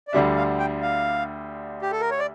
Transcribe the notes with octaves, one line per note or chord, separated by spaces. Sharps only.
D5
D2 D3 G3 D4 E5
F5
G5
F5
G4
A4
A#4
C#5
D5